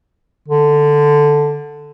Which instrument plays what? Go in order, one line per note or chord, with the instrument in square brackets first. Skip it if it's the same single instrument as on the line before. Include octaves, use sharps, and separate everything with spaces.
[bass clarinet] D3